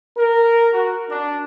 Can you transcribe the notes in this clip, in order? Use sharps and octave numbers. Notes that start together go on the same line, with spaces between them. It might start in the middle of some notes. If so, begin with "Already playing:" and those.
A#4
F#4
D4